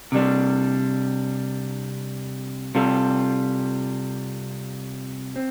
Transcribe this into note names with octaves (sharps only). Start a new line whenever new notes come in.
C3 G3 D4
C3 G3 F4 A4
C4